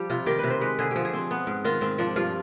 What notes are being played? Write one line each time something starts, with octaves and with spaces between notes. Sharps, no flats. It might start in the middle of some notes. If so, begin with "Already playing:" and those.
Already playing: F3 G3 G4
C3 F4
D#3 G4
C3 B4
C5
G#3 B4
D3 G#4
F3 G4
G#4
C4
B3
G#2
D#3 F4
G#2 C4
F3 D4
G2 F4